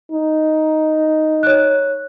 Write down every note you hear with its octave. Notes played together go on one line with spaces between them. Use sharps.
D#4
C#5 F#6